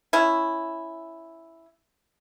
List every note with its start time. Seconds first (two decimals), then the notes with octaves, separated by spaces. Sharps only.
0.13 C#4 E4